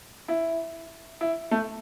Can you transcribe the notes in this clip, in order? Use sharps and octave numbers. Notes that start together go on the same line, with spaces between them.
E4
E4
A3